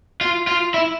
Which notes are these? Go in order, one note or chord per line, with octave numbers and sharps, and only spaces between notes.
F4
F4
E4